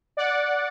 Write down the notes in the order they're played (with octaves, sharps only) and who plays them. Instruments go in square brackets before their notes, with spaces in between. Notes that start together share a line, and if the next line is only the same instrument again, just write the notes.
[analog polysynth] D5 F#5